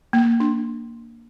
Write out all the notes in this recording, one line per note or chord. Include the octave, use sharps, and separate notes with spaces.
A#3
D4